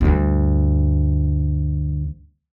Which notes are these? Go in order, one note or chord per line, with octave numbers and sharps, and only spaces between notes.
D2 G2